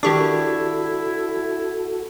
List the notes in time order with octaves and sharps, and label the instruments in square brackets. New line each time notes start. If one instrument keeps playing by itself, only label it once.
[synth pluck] D#3 G4 C#6 [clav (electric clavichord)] D4 [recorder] E4 [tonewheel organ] F#4 A4